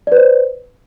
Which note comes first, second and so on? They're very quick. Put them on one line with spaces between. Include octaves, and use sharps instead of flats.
D5 B4 C5